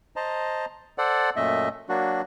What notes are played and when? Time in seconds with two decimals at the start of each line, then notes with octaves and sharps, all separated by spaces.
0.16 C5 D#5 A5 A#5
0.98 A4 C5 D5 F#5
1.36 F#2 A#2 A3 D#5 E5
1.89 F#3 A#3 D4 F#4